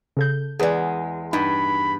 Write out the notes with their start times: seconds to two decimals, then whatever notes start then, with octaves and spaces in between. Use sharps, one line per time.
0.17 C#3 A4 G6
0.59 E2 G#3 G#4 B4 D5
1.33 G2 D#4 B5